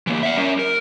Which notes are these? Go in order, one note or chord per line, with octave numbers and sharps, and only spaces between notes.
E3 A#3
E5 F#5
C#4 A#4
A#4